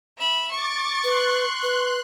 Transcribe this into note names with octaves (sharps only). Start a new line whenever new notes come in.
E5 B5
C#6 D6 A6
B4 C6 F#6
B4